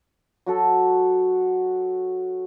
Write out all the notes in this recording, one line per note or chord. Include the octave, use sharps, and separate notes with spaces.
F#3 F#4 A4